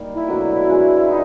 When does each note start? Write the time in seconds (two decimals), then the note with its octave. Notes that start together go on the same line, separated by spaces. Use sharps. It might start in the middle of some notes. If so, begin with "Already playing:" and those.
Already playing: G3 A#3 D#4
0.14 E4
0.28 B2 F#3 A3 D4
0.68 G#3 B3 D4 F#4
1.09 F3 D#4